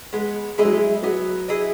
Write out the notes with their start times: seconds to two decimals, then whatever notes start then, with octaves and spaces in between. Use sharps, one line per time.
0.13 G#3 B3
0.58 G#3 E4 G#4 D#5
0.65 F#3
0.73 G#3
1.03 F#3 B3
1.48 E4 G#4 D#5